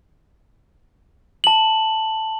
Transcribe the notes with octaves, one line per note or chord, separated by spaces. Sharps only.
A5 F#7